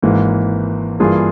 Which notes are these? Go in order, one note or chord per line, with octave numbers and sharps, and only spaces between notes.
G#1 G#2 E3 A#3
G2 E3 A#3 F4 G#4